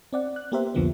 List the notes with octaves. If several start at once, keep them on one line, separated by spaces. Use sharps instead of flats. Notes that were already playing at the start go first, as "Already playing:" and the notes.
C4 D5 F#5
F#6
A#3 B3 G4 A#4 C5 E5
C2 F2 D3 F3 A#3 B3